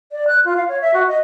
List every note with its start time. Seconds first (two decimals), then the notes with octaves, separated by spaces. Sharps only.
0.12 D5
0.27 F#6
0.45 F4
0.57 F5
0.68 C#5
0.82 E5
0.94 F#4
1.08 D#5